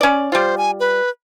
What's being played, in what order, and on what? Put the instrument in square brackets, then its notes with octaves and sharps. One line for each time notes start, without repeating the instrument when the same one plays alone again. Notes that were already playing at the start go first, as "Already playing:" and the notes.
[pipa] C#4 D5
[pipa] G3 F4 [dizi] C5
[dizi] G#5
B4